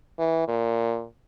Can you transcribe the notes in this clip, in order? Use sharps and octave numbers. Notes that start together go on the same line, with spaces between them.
E3
A#2